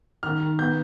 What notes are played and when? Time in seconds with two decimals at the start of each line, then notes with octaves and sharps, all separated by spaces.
0.23 D#3 F6
0.41 D#3
0.59 B3 G6